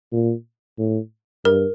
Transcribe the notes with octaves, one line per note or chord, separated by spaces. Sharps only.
A#2
A2
G2 A#4